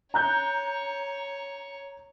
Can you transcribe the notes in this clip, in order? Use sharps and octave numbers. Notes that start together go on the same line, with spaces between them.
C#5 A#5 F#6 G6